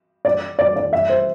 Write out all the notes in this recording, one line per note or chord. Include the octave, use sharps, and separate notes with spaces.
D5
D5
D5
E5
C5